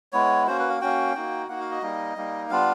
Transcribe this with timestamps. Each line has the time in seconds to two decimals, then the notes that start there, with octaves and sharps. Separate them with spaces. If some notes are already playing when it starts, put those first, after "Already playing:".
0.13 G#3 B3 E4 C#5
0.47 A#3 C#4 F#4 C5
0.59 B4
0.69 F5
0.81 A#3 C#4 F#4 G5
1.15 A#3 D#4 F#4
1.48 A#3 D#4 F#4 F#5
1.60 F5
1.71 D#5
1.82 G3 A#3 D#4
2.17 G3 A#3 D#4
2.50 G3 B3 D4 F4 F5